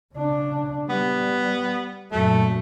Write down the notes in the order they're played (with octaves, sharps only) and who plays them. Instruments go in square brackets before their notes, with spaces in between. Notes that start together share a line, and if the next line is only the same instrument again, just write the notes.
[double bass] C#3 D4
[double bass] G3 [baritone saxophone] B3
[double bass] F#2 A#2 [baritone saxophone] A3